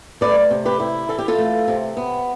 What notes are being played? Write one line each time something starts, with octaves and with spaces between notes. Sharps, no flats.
A3 B4 D5
C3
G4 B4
E4
E3 A4
G4
F4 A4
A3
C3
B3